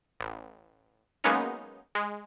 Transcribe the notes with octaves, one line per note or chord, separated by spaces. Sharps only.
A1
F#3 G#3 A#3 B3 C#4 D#4
G#3